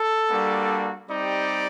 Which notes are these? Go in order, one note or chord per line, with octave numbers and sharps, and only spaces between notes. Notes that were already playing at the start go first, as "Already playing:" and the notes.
Already playing: A4
G3 A#3 D4 F#4
G3 C4 D#4 G4 D5